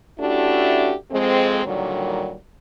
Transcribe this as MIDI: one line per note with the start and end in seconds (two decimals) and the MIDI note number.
0.19 0.93 57
0.19 0.93 61
0.19 0.93 62
0.19 0.93 64
0.19 0.93 66
0.19 0.93 67
1.11 1.60 41
1.11 1.60 56
1.11 1.60 60
1.64 2.35 46
1.64 2.35 50
1.64 2.35 51
1.64 2.35 54
1.64 2.35 55